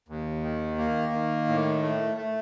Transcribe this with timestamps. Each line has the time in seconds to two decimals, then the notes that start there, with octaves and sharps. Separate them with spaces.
0.08 D#2
0.43 D#3
0.78 A#3
1.13 D#3
1.48 A2
1.82 A3
2.17 A3